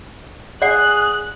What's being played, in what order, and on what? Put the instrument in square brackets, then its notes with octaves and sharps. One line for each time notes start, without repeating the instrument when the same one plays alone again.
[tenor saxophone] G#4 [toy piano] D5 F#5 [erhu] F#6